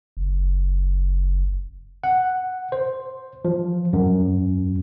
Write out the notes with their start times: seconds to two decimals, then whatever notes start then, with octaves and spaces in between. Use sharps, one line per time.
0.17 F#1
2.04 F#5
2.72 C5
3.45 F3
3.93 F#2